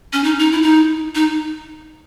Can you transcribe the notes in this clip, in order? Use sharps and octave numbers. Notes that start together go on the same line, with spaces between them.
C#4
D#4
D#4
E4
D#4
D#4